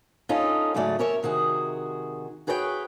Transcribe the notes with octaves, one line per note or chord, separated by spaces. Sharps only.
C#4 D#4 F4 A4
G#2 C#3 F#3 A3 D5
C#4 A#4 C#5 E5
C3 D#3 F#4 G#4
F#4 G#4 B4 C#5 D#5 G5